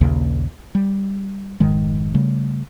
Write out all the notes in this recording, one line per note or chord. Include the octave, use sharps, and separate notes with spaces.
A#1 D#2 C#3 A#3
G3
F1 G#2 D#3 G#3
C#3 G3 A3